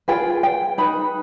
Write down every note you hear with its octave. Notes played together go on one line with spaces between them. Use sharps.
F4 G#4 B4 G5
G5
D#4 B4 B5